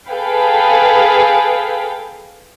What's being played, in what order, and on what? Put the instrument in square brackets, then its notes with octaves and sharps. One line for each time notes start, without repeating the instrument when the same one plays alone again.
[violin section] G#4 A4 B4 F5 G5